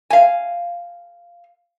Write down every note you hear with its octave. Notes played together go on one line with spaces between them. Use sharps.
F5 G#5